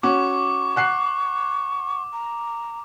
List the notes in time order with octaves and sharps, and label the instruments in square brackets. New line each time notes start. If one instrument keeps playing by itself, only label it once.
[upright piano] C#4 F#4 [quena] C#6 [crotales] D6
[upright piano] F#5 F#6 C7
[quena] A#5